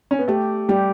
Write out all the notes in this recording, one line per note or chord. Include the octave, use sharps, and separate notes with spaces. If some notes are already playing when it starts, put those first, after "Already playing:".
C#4
B3
A3 G4
G3 G4